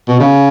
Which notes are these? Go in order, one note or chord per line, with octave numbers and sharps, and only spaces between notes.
B2
C#3